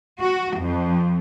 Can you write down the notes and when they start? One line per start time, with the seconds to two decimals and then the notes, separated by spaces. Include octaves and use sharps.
0.19 F#4
0.59 F2